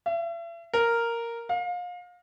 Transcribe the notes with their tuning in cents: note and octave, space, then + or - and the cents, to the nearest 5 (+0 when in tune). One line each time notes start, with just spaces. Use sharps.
E5 +40
A#4 -5
F5 +30